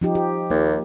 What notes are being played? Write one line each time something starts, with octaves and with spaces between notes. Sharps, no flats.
F3 D#4 G4
G4
D#2 A#3